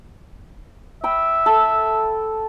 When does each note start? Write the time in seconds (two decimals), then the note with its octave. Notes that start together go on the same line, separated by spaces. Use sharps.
1.04 E5 G5 B5
1.46 A4